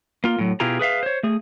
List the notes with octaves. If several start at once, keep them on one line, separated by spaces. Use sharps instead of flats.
A#3 F4
A2 F#3
B2 E4 F4 G4 G#4 A#5
G#4 B4 E5 F5
C5 C#5
A3 G#4